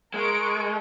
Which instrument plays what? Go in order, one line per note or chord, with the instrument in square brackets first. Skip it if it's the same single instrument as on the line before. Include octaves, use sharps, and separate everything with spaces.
[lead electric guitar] G#3 [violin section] A#4 C#6 D7